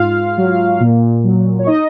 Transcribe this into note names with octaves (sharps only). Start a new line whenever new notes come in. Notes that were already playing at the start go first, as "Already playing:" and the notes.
Already playing: G#2 F4 F5
F#3
A#2
F#3
C#5
D#4 D#5